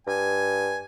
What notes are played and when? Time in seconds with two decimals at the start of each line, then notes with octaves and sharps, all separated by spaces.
0.07 G2 G#5